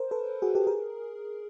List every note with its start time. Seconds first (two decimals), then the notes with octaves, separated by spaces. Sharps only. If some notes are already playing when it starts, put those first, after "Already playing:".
Already playing: A#4 C5
0.11 A4 B4
0.42 F#4 G#4
0.55 G4 A4
0.67 G#4 A#4